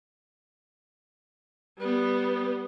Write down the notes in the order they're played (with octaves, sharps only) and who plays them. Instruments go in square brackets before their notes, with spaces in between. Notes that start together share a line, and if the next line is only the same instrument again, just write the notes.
[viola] G3 B3